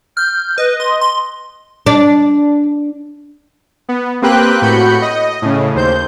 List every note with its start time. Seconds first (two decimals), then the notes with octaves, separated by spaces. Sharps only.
0.17 F6 G6
0.58 B4 D#5
0.80 C6
1.01 C6
1.86 D4
3.89 B3
4.22 A#3 C4 G4 B4 G5 F#6
4.62 A2 F#4 B5 G6 C#7
5.02 D#5
5.42 A2 C#3
5.75 D#2 C5 G6